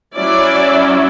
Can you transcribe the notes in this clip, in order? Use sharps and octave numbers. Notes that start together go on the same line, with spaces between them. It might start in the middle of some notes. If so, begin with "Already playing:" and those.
F#3 C#4 E4 D5